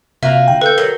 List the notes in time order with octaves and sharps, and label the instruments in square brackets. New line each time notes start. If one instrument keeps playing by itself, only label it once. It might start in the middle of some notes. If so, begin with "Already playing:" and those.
[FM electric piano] C3 [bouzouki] A#3 F4 F#4 [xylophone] E5
[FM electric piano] D3 G5
[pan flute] A4 [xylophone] B4 G6
[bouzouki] F#3 [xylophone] A#4